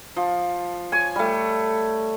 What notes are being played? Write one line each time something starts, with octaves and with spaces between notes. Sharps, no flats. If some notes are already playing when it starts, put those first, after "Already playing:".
F3
C#5 G#5
G3 A3